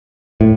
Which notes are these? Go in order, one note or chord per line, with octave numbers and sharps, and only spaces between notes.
A2